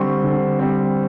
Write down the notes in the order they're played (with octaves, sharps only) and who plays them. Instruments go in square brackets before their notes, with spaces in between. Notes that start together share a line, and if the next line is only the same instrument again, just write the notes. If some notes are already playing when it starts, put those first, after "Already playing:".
Already playing: [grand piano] D3 G3 C4 C6 C#6
D3
G3 C4